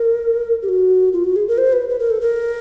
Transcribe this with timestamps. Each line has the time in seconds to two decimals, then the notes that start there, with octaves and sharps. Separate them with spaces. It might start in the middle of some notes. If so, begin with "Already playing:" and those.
Already playing: A#4
0.63 G4
0.69 F#4
1.13 F4
1.24 F#4
1.36 G#4
1.48 A#4
1.58 C5
1.73 B4
1.89 B4
1.99 A#4
2.10 A4
2.21 A#4